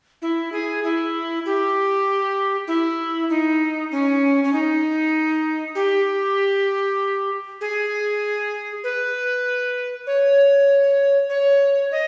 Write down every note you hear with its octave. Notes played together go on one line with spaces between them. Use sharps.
E4
G#4
E4
G4
E4
D#4
C#4
C#4
D#4
G4
G#4
B4
C#5
C#5
D#5